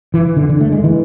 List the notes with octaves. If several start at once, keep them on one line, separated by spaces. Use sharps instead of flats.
E3
D3
D3
A3
G#3
E3